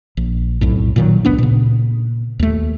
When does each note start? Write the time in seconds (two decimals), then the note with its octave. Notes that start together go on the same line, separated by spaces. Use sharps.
0.17 A#1
0.61 B1 F2 A2
0.96 A#2 D#3 F#3
1.25 G1 C#2 B3 D4
1.38 A#2 C#3
2.39 D#2 A3